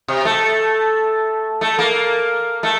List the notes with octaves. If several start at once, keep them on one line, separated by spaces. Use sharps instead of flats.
C3
A3
A3
A#3
A3